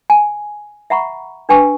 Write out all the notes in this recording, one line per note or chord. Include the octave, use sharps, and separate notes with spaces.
G#5
E5 F#5 A#5 B5 C#6
D4 B4 G5 G#5 C#6 E6